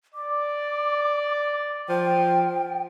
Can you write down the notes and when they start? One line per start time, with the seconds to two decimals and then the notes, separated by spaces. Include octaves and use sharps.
0.14 D5 D6
1.89 F3 G5